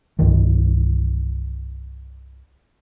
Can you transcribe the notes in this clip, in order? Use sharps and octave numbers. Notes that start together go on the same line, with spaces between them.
C2 G2 D#3 E3